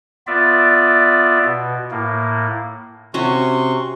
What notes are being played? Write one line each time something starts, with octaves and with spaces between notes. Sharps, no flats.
B3 F4 D5 E5
B2
A2 A#3
C3 C#4 F#4 C6 C#6